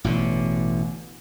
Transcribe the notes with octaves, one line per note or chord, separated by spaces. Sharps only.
A1 B2 D3